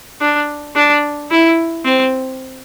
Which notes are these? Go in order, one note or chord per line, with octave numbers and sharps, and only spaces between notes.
D4
D4
E4
C4